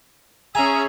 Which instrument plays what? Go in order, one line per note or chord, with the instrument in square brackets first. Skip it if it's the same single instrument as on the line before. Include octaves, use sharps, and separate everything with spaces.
[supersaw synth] C#4 G#4 [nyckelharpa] E5 A#5 [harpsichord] G#5